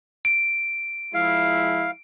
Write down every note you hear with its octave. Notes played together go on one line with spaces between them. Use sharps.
D7
F3 G#3 E4 F5